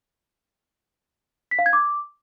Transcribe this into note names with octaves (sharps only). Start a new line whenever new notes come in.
B6
F5
G#6
D6